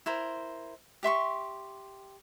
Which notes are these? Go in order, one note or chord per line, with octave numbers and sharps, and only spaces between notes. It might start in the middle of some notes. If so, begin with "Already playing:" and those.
E4 A#4 C5
G4 E5 C6 C#6